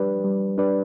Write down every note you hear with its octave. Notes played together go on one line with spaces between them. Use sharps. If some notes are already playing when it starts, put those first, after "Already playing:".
Already playing: G3 D4 G4 B4 D5
G3
D4 G4 B4 D5